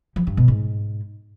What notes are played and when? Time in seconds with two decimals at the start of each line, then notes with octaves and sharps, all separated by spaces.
0.16 F3
0.27 G2
0.37 B2
0.48 G#2